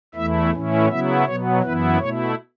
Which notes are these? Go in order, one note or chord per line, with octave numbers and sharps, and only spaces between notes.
E2 E3 A3 E4 E5
A2 E3 C#4 E4
C#3 F#3 B3 E4 E5
B2 F#3 B3 C#5
F#2 E3 B3 E4 B4
B2 A3 E4 C#5